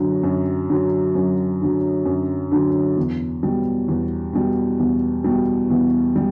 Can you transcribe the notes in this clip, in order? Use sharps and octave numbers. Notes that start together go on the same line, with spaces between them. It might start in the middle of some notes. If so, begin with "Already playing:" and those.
Already playing: F#2 D3 F#3
F#2
D3 F#3
F#2
D3 F#3
F#2
D3 F#3
E2
B2 G3
E2
B2 G3
E2
B2 G3
E2
G3